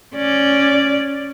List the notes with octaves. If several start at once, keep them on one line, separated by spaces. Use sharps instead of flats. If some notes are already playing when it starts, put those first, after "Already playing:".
C#4 D5